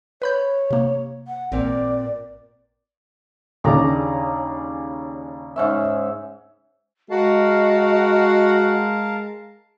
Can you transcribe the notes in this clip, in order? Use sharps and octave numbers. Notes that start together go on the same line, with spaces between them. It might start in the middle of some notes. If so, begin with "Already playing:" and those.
B4 C#5 B5 G6
C3 A#3
F#5
A1 A#2 C4 A#4 D5
D#2 C#3 D4 G#4 D5 A#5
G#2 C#4 E5
G#3 F#4 A#4 D#5 F5 A5